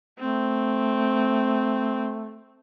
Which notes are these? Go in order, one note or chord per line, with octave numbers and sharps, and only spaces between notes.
A3 C4